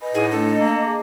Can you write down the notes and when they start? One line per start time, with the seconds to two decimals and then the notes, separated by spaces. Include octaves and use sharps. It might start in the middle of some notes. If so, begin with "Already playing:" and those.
0.01 B4 D#5 G#5 B5
0.14 A2 D#4 G#4 F#5
0.31 A3 D4 A4
0.59 A#3
0.80 G#4 A5 D6